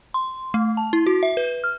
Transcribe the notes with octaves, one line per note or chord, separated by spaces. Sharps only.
C6
A3
A5
E4
F#4
E5
B4
F6